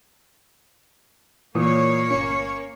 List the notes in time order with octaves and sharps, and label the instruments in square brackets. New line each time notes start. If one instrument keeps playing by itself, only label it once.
[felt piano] A#2 [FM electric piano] E3 D#6 [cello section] A#3 C#5
[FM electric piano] G1 C#7 [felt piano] C#4